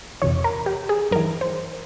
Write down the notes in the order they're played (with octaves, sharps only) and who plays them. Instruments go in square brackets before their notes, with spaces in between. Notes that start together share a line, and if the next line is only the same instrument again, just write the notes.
[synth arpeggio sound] F2 C3 E3 C#5
A#4
G4
G#4
G2 E3 A#4
C5